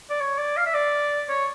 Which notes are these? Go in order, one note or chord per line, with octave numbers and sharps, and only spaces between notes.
D5
C#5
D5
F5
E5
D5
C#5